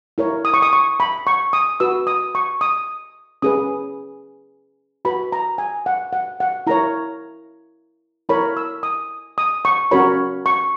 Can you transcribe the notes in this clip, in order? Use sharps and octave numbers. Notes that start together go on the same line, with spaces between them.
E4 A#4 C#5
D#6
C#6
D#6
C#6
B5
C#6
D#6
F#4 B4 E6
D#6
C#6
D#6
C#4 G#4 B4 D#6
F#4 B4 B5
A#5
G#5
F#5
F#5
F#5
E4 A#4 C#5 A#5
E4 A#4 C#5 B5
E6
D#6
D#6
C#6
C#4 F#4 A#4 C#5 B5
C#6